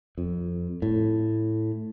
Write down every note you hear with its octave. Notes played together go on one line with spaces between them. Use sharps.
F2
A2